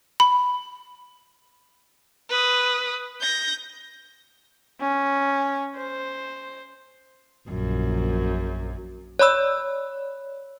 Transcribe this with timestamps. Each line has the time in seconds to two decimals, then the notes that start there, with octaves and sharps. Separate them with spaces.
0.20 B5
2.29 B4 D#6
3.21 G6 A#6
4.81 C#4
5.76 C5
7.49 A#1 F#2
9.19 C#5 D5 B5 E6